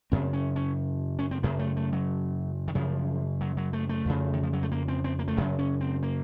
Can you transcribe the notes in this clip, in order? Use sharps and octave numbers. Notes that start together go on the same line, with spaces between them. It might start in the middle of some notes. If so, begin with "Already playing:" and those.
F#2 C#3 C4
C#4
C#4
C#4
C4
F#2 C#3 A#3
A3
A3
F#3
D#3
F#2 C#3 F3
F#3
F#3
A3
A3
F2 C#3
D#3
F3
F#3
A3
A#3
C4
C4
A#3
A3
F#2 C#3 F#3
C#4
C4
A#3